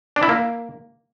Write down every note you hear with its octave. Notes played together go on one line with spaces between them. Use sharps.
D4
E4
A#3